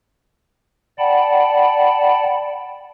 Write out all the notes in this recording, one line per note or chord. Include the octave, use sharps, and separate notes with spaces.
D5 F#5 G5 A5 B5